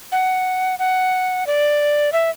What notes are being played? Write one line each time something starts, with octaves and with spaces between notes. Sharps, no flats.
F#5
F#5
D5
E5